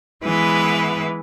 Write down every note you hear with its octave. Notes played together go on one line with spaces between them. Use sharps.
E3 G#3 B3 B4